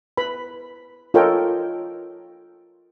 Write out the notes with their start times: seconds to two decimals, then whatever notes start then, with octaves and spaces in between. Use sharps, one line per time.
0.17 B4 B5
1.14 F4 A4 A#4 C#5 D#5 G5